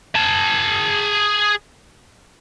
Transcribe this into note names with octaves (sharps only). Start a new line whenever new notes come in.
G#4 A5